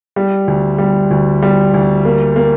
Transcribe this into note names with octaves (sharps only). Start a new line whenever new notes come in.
G3
D2
G3
D2
G3
D2
A#3
A#3